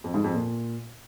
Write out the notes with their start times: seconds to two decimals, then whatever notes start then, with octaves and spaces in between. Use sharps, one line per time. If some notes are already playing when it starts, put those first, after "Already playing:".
0.04 F2
0.14 G#2
0.24 F2
0.34 A#2